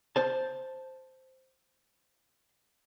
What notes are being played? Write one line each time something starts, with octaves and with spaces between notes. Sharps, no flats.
C5 A5